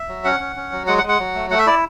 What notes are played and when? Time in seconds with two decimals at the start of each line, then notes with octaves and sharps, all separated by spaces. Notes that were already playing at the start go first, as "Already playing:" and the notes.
Already playing: E5
0.08 F#3
0.24 C#4 F#5
0.40 C#4
0.56 C#4
0.72 F#3
0.87 G#3 F#5
0.98 F#5
1.03 G#3
1.09 F#5
1.19 F#3
1.35 A3
1.50 A3 F#5
1.59 E5
1.67 E4 D5